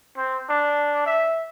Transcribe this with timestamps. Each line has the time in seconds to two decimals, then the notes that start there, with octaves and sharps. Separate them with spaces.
0.17 C4
0.49 D4
1.06 E5